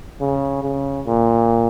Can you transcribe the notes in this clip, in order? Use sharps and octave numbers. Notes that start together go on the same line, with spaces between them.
C#3
C#3
A#2